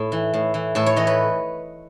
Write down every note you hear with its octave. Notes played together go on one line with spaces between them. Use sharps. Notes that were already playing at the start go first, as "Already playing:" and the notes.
Already playing: A2
E3
A2
E3
A2 A4
C#5
E3 D#5
B4